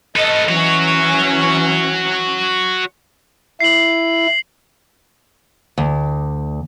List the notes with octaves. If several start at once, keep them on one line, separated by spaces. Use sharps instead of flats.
A4 B4 D#5
E3 C#4 F#4 C#5
E4 C7 F#7
D2